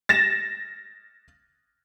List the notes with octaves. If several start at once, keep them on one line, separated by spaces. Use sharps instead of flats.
A6 A#6 E7